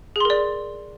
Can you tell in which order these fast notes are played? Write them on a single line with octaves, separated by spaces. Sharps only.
G#4 C6 A#4 D5